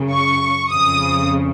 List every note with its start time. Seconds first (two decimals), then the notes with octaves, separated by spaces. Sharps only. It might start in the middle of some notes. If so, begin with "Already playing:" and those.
Already playing: F#2 C#3
0.10 C#6
0.70 F2 C#3 D#6